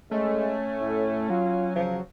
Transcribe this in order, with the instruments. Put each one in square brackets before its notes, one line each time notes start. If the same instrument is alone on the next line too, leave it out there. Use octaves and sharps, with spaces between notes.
[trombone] G#3 [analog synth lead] A3 [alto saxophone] C#4
[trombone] A2
[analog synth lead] F#3 [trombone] F4
[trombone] C#3 [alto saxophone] F3